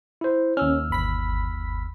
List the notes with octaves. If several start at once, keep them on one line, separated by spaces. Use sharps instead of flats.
E4 C5
D#2 C#4 E6 F6
G1 B5 B6